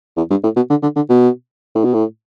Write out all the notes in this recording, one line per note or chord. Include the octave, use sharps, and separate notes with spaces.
E2
G2
A2
B2
D3
D3
D3
B2
A2
B2
A2